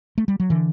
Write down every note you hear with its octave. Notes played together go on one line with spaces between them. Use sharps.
A3
G3
F#3
D3 E3